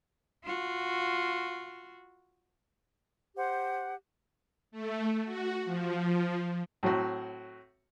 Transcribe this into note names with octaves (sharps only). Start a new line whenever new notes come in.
F4 F#4
G4 C5 F#5
A3
F#4
F3
A2 F#3 C4 F#4